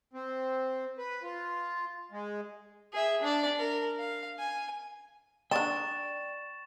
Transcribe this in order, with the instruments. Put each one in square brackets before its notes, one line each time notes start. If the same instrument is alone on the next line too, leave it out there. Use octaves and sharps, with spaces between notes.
[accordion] C4
B4
F4
G#3
[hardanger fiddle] G#4 E5
D4 D5
A#4
F5
G#5
[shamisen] D4 D#4 [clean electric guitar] D5 G5 [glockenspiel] C#6 A6 E7